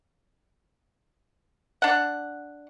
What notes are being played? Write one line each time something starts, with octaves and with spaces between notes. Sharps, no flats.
D4 F#5